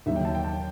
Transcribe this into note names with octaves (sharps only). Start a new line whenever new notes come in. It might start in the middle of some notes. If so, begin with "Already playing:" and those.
D#2 D#3 F#3 E5
G5
A5
G5
A5